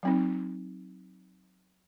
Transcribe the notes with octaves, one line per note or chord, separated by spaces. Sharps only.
F#3 C4 D#4